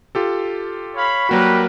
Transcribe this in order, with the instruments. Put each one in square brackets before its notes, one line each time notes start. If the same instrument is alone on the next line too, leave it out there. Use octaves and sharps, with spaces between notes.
[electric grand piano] F4 G4 A4
[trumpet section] C#5 F5 B5
[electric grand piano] F#3 A#3 F#4 [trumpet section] G3 A#4 B4